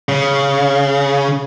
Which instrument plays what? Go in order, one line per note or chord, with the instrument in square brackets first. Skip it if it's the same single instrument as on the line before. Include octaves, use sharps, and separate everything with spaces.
[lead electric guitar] C#3